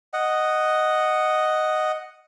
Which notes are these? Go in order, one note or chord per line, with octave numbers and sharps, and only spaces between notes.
D#5 F#5